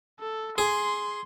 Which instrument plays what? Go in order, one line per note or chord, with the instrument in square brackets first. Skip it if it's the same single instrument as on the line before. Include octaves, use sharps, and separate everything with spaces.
[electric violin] A4
[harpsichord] G#4 [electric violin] C6